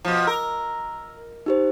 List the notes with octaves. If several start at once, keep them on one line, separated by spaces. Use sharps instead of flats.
B2 F3
A#4 E6
D#4 G4 C5